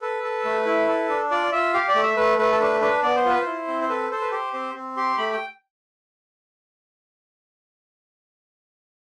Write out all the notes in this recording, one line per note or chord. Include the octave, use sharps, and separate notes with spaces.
A4 B4
A4
A3
E4
A4
D4
F4 D5
F4 E5
G4 F5
D5
A3
E5
A3 B4
A3 B4
A4
D4 B4
D4 B4
B3 D5
C5
F4 B4
E4 C5
C4
C5
A4 B4
A4 C5
B4
G4 C5
C4 C5
C4
G4 C6
A3 B5
G5